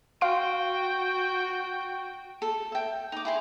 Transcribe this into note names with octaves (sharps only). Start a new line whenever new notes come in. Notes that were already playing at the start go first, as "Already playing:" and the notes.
F#4 F5 G5 C6 D7
A4
E5 G5
D#4 D6
E4 G#4 C6